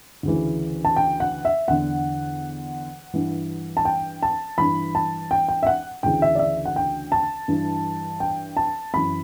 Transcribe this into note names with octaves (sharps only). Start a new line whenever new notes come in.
D2 C#3 E3
A5
G5
F#5
E5
E2 D3 F#5
G2 E3
A5
G5
A5
G2 E3 B5
A5
G5
G5
E5
F#5
D2 C#3 E3 G5
E5
D5
E5
F#5
G5
A5
G2 E3
G5
A5
F#2 E3 B5